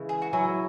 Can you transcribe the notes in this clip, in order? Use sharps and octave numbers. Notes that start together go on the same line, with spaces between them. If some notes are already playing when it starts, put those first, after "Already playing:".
Already playing: C#3 E3 G#3
G#4
F#4
F#3 E4 G#4